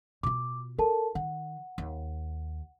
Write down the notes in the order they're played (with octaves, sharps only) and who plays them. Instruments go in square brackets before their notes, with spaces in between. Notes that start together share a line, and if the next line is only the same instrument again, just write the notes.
[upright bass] B2 F4 [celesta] D6
[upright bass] F4 [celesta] A4 A#4 A5
[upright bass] D#3 [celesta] F#5
[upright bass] D#2